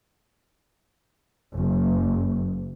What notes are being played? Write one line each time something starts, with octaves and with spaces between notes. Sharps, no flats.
F#1